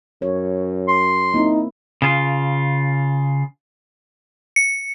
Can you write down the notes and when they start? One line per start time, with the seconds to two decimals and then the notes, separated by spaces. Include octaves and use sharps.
0.22 F#2 C#5
0.88 C6
1.34 A#3 C4 D#4 E4
2.02 C#3 F4
4.56 C#7